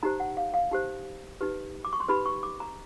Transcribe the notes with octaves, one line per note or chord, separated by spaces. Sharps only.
D#4 G4 C5 A#5
F#5
F5
F5
D#4 G4 C5
D#4 G4 B4
D6
C#6
C6
D#4 G4 B4 B5
C#6
D6
A#5